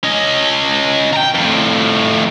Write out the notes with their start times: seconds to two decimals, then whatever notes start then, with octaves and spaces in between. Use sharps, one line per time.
0.03 C#4 D#5
1.13 G5 A#5
1.35 F2 A2